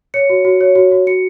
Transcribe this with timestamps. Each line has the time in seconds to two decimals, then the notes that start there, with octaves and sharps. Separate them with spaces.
0.14 C#5 C#7
0.30 F#4
0.45 F#4
0.61 C#5
0.76 F#4
0.91 F#4
1.07 F#4 C#7